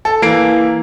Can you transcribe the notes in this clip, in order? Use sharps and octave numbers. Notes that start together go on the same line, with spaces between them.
A4
E3 A#3 C7 D7